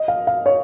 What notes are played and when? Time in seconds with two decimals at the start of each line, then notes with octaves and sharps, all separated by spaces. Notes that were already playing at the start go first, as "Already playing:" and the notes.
Already playing: D#5
0.08 F5
0.27 F5
0.46 C#5